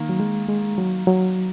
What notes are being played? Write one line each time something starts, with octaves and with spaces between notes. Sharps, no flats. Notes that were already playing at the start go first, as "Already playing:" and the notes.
Already playing: D#3 A#3
F#3
G#3
G#3
F#3
F#3